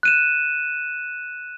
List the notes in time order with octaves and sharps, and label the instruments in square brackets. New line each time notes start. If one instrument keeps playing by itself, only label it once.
[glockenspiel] F#6 D#7 E7